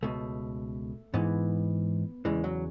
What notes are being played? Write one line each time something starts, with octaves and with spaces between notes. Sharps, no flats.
C#2 B2 A3
G#2 E3 B3
E2 C#3 E3 G#3
F#3